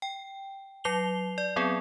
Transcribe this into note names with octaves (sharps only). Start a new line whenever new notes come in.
G5
F#3 C7 F7 G7
D5
F#3 B3 C4 G#4